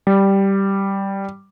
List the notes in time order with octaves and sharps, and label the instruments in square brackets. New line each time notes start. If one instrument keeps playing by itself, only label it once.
[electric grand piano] G3